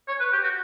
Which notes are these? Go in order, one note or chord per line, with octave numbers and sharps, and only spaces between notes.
C#5
B4
G4
F#4